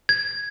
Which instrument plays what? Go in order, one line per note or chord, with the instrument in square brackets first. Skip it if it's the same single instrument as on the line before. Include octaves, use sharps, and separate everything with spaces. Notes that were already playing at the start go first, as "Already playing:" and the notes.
[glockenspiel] G#6